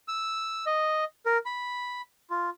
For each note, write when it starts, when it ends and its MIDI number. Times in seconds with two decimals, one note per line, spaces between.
0.08 0.65 88
0.66 1.04 75
1.26 1.38 70
1.46 2.01 83
2.30 2.50 65